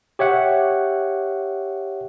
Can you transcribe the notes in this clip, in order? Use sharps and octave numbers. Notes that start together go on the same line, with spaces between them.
G4 C#5 E5 F#5